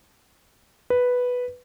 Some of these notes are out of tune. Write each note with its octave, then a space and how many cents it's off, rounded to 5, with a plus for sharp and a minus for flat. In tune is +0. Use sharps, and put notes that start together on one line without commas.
B4 +0